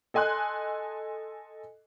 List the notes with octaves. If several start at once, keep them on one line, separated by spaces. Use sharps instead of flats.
A4 D#5 G#5 C6 F#6